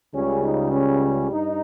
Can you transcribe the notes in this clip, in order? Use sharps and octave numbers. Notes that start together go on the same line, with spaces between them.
C#2 C#3 G3 C#4
D#4
C#4
G2 D#4